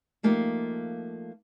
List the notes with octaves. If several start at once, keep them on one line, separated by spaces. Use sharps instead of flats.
F3 A3 A#3 D#4 F4 G4